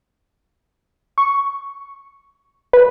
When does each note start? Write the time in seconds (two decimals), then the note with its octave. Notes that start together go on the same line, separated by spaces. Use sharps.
1.18 C#6
2.73 B4